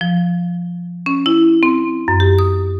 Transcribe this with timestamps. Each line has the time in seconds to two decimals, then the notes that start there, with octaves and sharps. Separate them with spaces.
0.01 F3
1.06 C#4
1.26 E4
1.63 C4
2.08 F#2
2.20 G4
2.39 D#6